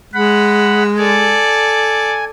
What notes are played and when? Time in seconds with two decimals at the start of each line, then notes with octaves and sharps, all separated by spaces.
0.14 G#3 F#5 B5
0.97 A4 D5 G#5